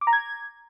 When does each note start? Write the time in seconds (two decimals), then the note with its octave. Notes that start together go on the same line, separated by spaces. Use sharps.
0.01 D6
0.07 A#5
0.13 G#6